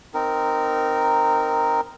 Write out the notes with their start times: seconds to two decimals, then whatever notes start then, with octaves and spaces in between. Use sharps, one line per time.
0.14 C4 D#4 A#4